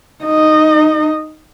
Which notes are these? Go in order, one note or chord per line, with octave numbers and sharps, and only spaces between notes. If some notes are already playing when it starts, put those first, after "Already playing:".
D#4 D#5